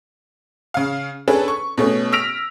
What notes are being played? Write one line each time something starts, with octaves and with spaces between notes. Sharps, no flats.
C#3 F5
C#4 D4 G#4 A4 B4
C#6
B2 A3 C#4
E6 F6 A#6 B6 D7 F7